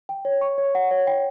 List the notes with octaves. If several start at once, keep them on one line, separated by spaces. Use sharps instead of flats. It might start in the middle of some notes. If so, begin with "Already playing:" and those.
G5
C#5
C#6
C#5
F#5
C#5
G5